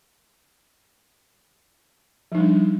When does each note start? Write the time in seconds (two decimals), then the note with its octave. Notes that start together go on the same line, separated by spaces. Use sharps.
2.32 F3
2.35 D#4
2.38 G3
2.40 D4